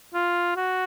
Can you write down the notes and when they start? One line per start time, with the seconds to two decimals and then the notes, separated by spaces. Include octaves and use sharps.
0.14 F4
0.57 F#4